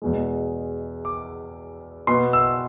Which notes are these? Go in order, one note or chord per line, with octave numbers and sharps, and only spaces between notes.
E2 B2 G#3
D6
B2 B3 C6
E6